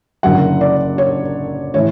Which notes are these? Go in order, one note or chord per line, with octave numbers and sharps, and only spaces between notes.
F#1 F#2 D3 F#3 F#5
D5
C#5
A2 E3 C#5